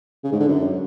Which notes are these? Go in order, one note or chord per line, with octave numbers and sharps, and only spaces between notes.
C#3
G#2
D3
F#2